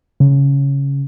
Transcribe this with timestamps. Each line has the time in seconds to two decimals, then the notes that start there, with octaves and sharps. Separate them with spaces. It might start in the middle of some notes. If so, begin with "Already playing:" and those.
0.20 C#3